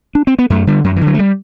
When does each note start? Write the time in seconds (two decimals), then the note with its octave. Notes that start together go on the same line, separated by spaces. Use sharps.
0.15 D4
0.27 C4
0.39 B3
0.50 F#2 A3
0.67 D3 G3
0.84 F#2 F#3
0.96 E3
1.01 D3
1.07 F#3
1.14 A3
1.19 G3